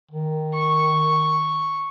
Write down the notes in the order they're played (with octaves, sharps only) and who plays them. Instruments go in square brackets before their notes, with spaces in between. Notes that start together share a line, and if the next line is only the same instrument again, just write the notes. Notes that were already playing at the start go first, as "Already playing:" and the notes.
[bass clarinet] D#3
[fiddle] C#6